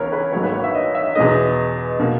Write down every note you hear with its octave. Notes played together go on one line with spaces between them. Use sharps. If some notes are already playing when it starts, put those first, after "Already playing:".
Already playing: C#2 C#3 E3 B3 A#4 B4 C#5
B4
G#1 G#2 F#3 A#3 C#5
B4
C#5
E5
D#5
E5
E2 B2 G#3 B3 D#5
B2 A#3